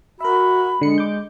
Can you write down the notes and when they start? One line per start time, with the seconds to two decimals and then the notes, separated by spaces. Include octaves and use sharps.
0.21 F#4 A#4 E5 B5
0.81 D3 G#3 C#7
0.98 D6 G6